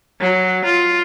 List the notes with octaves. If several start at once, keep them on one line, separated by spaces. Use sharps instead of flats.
F#3
F4